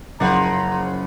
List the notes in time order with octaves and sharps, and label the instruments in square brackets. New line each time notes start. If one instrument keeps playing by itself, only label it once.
[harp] F#1 [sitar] C#3 F3 [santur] D5 F#5 B5 [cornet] A#5